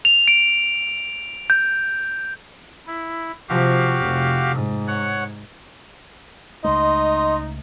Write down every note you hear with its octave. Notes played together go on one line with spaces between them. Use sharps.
F7
D7
G6
E4
C3 F3 F#4 G4 F5
F1
G#2
C#5 F#5
C#2 G#3 A3 D#4 D#5 C6